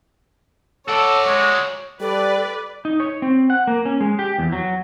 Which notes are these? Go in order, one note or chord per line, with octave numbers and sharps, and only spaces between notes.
F#4 A4 C#5 D5
G#3
G3 A4 B4 D5
D#4
C#5
C4
F#5
A#3
C#4
G#3
G4
E2
F#3